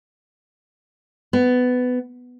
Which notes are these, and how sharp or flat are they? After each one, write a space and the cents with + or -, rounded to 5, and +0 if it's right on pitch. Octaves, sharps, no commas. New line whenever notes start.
B3 +15